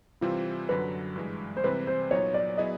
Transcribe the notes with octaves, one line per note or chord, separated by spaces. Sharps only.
C3 E3 G3 C4 F4
F#2 D3 F#3 B4
G2 E3 G#3
C5
C3 E3 G3 C4 B4
C5
A#2 F#3 B3 D#4 C#5
D5
F#3 B3 E4 G#4 B4 D#5